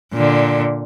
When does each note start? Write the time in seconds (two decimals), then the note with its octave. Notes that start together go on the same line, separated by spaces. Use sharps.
0.13 A#2 D3